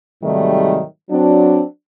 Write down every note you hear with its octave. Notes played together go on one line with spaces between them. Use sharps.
G#2 C3 D#3 F#3 G3 A3
F#3 C4 D4